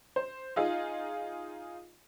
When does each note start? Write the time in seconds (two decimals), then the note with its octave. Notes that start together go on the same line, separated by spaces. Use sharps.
0.16 C5
0.56 D#4 F4 G#4